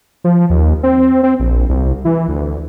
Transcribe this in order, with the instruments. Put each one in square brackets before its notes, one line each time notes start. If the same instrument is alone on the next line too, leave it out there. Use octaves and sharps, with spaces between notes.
[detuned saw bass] F3
D#2
C4
C4
A#1
C2
E3
D2